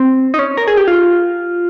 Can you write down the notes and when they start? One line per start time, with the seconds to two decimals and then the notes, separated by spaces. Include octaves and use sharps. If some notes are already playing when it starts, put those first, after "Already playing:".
Already playing: C4
0.34 D#4
0.39 C#4
0.57 A#4
0.68 G#4
0.77 G4
0.88 F4